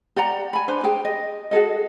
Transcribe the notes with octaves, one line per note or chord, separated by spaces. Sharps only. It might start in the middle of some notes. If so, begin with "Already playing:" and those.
G4 D5 F#5 A#5
G#5 B5
D4 B4 C5
G4 G#4 G5
D#5
F#4 G#4 A4 D#5